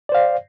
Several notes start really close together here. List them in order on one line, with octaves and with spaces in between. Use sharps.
D5 C5 F5